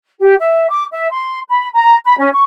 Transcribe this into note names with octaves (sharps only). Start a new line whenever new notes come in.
G4
E5
D6
E5
C6
B5
A#5
B5
C#4
C#6